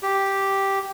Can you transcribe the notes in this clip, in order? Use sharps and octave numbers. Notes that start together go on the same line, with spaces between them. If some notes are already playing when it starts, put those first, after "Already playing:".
G4